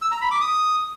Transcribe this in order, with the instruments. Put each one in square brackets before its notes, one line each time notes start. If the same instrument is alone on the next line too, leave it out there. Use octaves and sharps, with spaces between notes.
[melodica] E6
A#5
B5
D6
D#6